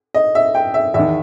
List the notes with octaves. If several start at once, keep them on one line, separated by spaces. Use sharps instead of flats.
D#5
E5
G5
E5
E2 E5
D#3